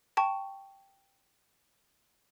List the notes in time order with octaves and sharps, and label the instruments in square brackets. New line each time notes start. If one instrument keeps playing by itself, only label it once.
[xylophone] G5 A5 C#6